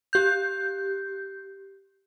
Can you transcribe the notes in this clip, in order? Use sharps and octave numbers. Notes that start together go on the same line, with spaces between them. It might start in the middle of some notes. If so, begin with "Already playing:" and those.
G4 G6